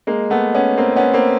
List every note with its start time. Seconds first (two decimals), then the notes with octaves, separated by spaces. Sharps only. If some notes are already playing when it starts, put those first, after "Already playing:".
0.07 G#3 A#3
0.30 A3 B3
0.55 B3 C#4
0.78 A#3 C4
0.96 B3 C#4
1.13 A#3 C4